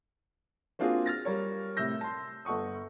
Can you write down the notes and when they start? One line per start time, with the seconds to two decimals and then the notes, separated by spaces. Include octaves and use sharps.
0.79 A#3 C4 D4 F4 F#4 G#4
1.06 F6 A6 A#6
1.25 G3 A#4 C#5
1.77 A2 C3 E6 G6 A#6
2.01 A5 C6
2.45 G1 A4 F#5 C#6 D#6